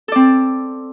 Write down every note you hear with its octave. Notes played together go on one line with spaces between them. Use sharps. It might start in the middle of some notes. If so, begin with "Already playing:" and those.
C4 A4 D5